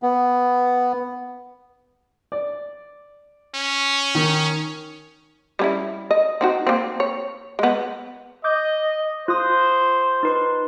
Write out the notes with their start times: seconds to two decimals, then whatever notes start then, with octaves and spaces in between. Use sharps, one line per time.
0.03 B3
2.32 D5
3.55 C#4
4.15 D#3
5.59 G3 C#4 E4
6.11 D#5
6.41 C4 D#4 F#4
6.67 A#3 C4
7.00 C#5
7.59 G#3 B3
8.44 D#5 D6 G6
9.28 F4 C5 D#6
10.23 D#4 B4 C6